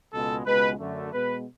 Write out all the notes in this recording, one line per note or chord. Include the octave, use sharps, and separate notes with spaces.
C#2 B2 G#3 A4
C#2 B2 G#3 B4
F#2 D3 A3
B2 G#3 B3 B4